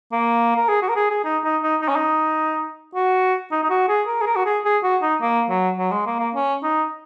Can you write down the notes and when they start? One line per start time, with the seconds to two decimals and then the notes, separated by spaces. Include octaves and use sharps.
0.12 A#3
0.56 A#4
0.69 G#4
0.82 F#4
0.89 A#4
0.96 G#4
1.11 G#4
1.24 D#4
1.44 D#4
1.63 D#4
1.81 D#4
1.88 C#4
1.96 D#4
2.95 F#4
3.51 D#4
3.63 D#4
3.70 F#4
3.88 G#4
4.07 A#4
4.22 G#4
4.26 A#4
4.36 F#4
4.45 G#4
4.65 G#4
4.83 F#4
5.02 D#4
5.21 A#3
5.49 F#3
5.78 F#3
5.91 G#3
6.06 A#3
6.19 A#3
6.35 C#4
6.63 D#4